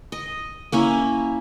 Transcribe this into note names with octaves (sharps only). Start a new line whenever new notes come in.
D#5
A#3 C#4 E4